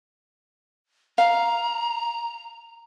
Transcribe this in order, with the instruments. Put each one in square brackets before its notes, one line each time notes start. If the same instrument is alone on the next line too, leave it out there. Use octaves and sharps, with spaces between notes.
[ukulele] F5 [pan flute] A#5